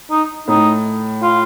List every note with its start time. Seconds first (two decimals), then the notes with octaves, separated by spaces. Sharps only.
0.11 D#4
0.48 A2 D#4
1.22 F4